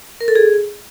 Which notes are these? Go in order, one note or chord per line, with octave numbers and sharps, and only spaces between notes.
A#4
A4
G#4